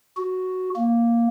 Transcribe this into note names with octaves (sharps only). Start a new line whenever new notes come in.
F#4
A#3